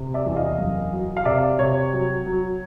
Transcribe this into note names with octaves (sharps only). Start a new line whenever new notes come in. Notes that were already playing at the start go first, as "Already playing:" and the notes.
Already playing: C3
D5 E5
E2
D#5 F5
F#2
F#3
F5
C3 D5 E5
C3 C#5
F#3
F#3